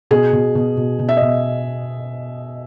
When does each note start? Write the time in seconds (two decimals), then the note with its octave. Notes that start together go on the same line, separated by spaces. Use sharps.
0.11 B2 G#4
0.33 B2
0.55 B2
0.77 B2
0.99 B2
1.09 E5
1.17 D#5
1.22 B2